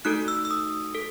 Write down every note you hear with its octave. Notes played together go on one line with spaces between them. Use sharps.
A3 D#4 F#4 A4 F#6
E6
E6
D#6
A4